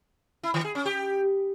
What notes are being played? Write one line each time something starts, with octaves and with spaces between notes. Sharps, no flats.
E4
D#3
G#4
C#4
G4